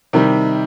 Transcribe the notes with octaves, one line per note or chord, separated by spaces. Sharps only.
C3 D#3 G3